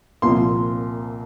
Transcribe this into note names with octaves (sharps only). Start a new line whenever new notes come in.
C2 A#2 F3 C6